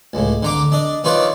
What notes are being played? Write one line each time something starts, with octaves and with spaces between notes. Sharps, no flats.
C#2 A2
D3 A#5 D6
D4 D#5
D#3 D#4 F4 B4 C#5 D5